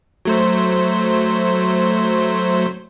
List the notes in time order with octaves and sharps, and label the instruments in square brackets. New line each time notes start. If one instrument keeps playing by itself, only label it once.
[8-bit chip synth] F#3 A3 C5